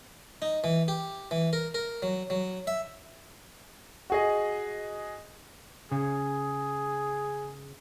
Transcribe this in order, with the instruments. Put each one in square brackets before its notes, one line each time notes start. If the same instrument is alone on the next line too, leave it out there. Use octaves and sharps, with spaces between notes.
[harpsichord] D#4
E3
G4
E3
A#4
A#4
F#3
F#3
E5
[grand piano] F#4 G#4 D#5
[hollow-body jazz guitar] C#3 [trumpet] G#4